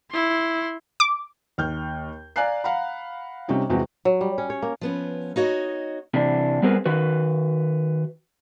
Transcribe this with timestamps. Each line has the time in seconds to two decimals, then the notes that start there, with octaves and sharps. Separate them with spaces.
0.11 E4 C6
1.00 D6
1.58 D#2 F6 G6
2.36 D5 F5 G#5 A#5 F#6 C7
2.64 F5 F#5 A#5 B5
3.48 C3 G3 C#4 D#4
3.70 E2 C3 G#3 F#4
4.05 F#3
4.21 G3
4.38 C#4
4.50 C#5
4.62 A#3
4.81 F3 B3 C#4
5.36 D#4 F#4 C#5 D#5
6.14 C3 E3 D4
6.62 G3 B3 C4 G#4 A#4 B4
6.86 D#3 F#4 B4